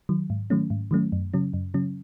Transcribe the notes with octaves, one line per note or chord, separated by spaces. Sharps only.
D#3 F#3
G#2
D#3 F#3 A3 C#4
G#2
D#3 F#3 A3 C#4
F#2
C#3 F#3 C#4
F#2
C#3 F#3 C#4